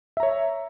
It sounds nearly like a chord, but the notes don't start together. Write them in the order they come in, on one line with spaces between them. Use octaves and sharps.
E5 A#5 C#5